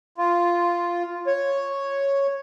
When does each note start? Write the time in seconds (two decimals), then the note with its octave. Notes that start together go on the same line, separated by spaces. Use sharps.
0.18 F4
1.27 C#5